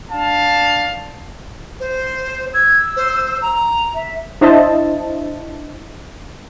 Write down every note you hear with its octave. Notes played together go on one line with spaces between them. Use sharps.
D4 F5 A5
C5
E6 G#6
C5
A#5
E5
D4 E4 C5 D#5 E5 A5